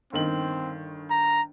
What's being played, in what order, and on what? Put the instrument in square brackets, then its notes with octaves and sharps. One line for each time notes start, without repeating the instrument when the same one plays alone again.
[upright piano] G1 D#3 F#7 [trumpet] C4
[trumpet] A#5